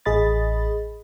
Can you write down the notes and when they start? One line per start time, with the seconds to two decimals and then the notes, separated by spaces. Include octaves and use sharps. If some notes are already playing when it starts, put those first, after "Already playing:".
0.05 A1 G#4 D#5 B5 A6